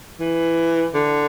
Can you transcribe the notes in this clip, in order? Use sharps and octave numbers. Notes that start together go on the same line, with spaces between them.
E3
D3